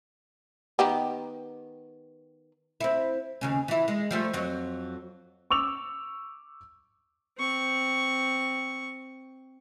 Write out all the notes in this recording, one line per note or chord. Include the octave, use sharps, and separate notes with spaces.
D#3 B3 G4
C4 E4
D#2 C#3 C#4
E3 E4
G#3
F3 G3 A3
F2 F#3
C#6 D6 E6 F7
C4 C#6